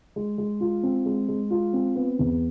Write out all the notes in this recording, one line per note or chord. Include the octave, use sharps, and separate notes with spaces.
G#3
G#3
F4
C4
G#3
G#3
F4
C4
B3
E2